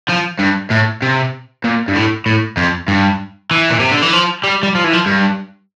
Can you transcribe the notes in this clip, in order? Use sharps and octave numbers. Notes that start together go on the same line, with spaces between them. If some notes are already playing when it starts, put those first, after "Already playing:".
F3
G2
A2
C3
A#2
G2
A2
A2
F2
G2
E3
A#2
C3
D3
E3
F3
G3
G3
F3
E3
F3
G2